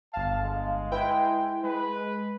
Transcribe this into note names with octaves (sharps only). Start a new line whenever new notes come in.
G1 F5 A5
G#3
E4 B4 G5
G#3 B4